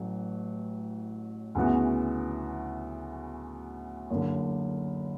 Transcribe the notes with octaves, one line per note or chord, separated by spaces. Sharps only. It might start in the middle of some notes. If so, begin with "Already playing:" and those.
Already playing: A1 A2 F#3 A3
D2 C#3 E3 B3 F#4
F#1 F#2 D3